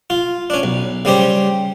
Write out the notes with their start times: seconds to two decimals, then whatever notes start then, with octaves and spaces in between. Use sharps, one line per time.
0.10 F4
0.50 C#4 D4
0.63 B1
1.05 C#3 G3 G4 C5